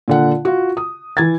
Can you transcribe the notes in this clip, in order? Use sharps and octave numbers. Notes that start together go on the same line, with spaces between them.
A#2 D3 F#5
F4 F#4
D#6
E3 G#6 A6